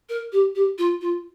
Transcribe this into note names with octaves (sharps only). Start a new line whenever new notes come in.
A#4
G4
G4
F4
F4